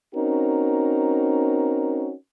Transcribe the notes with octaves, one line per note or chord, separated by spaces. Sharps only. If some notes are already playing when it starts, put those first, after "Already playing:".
C4 C#4 D#4 F#4 A#4